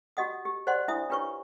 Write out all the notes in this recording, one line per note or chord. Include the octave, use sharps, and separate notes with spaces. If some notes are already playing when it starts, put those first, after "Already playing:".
F#4 G4 D#5 F#5 D#6
G4
C5 D5 D#5 F#5 C6
D4 E4 F4 E5 D#6
D4 F4 G4 B4 C#5 C#6